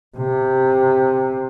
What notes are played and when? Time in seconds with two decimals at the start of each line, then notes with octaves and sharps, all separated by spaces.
0.17 C3